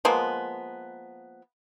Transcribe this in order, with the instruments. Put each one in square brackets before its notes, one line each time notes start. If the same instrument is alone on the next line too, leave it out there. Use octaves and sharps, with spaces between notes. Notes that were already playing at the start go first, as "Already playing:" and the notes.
[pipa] F3 G#3 A#3 B3